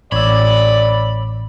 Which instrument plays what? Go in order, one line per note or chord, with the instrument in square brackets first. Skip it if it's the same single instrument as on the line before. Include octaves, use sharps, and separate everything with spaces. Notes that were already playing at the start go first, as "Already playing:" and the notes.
[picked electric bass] A1 [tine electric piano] C#5 E6 [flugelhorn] D5 [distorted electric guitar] B5